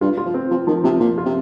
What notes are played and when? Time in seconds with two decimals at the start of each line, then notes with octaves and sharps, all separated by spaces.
0.01 G2 F4
0.18 F4
0.26 F3
0.34 C4
0.51 F3 C4
0.67 D#3 F3
0.84 C3 F3
1.00 A#2 F3
1.18 F4
1.26 C3